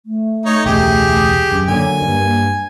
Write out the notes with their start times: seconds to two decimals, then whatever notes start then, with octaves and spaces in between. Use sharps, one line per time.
0.06 A3
0.46 D#4 C#5
0.66 E1 C#2 G4 G#4
1.52 F#2
1.68 D3 F#3 A#3 G#5
2.02 G2